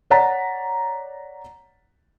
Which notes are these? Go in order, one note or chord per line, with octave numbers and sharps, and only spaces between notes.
C#5 D5 F#5 A#5 A6 B6